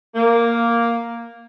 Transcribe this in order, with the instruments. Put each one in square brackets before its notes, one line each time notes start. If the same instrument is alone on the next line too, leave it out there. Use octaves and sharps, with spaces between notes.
[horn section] A#3